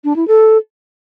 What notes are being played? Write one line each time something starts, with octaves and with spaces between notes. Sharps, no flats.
D4
E4
A4